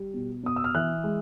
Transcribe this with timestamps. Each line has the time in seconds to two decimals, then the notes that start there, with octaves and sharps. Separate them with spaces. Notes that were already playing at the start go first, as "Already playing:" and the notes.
Already playing: G3
0.14 B2
0.43 B2 D#6
0.56 E6
0.64 F6
0.75 E3 F#6
1.04 G#3